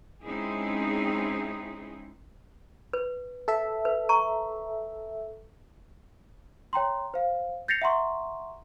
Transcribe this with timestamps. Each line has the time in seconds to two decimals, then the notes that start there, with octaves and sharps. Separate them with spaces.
0.24 G#3 C4 C#4 D#4 E4 G#4
2.93 B4
3.48 A4 E5
3.85 B4
4.09 A#5 C#6
6.73 C#5 G5 A#5 C6
7.14 C5 F5
7.68 G6 A6 A#6 C7 C#7 F7
7.82 E5 F#5 A#5 C6 C#6